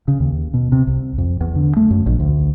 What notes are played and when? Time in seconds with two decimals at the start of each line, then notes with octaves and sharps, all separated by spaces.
0.08 C#3
0.20 D#2
0.54 B2
0.72 C3
0.87 C2
1.18 F2
1.41 E2
1.56 D3
1.77 A3
1.91 F#2
2.06 A#1
2.20 D2